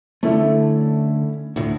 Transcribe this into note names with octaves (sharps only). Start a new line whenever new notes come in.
D3 A3 C#4 E4 A4
D2 A2